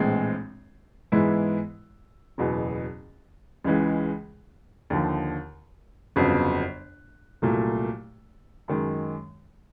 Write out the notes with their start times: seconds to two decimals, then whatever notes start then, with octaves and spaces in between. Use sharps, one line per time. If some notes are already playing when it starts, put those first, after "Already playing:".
Already playing: A#1 A2 E3 G#3 C4
1.12 G#2 E3 G#3 B3 E4
2.38 F#1 E2 B2 F#3 B3
3.64 C#2 C#3 E3 G#3
4.90 D#2 D3 F3
6.16 G1 F2 C#3 F#3 B3
7.42 C2 A#2 F#3 A3
8.68 F#2 D#3 G#3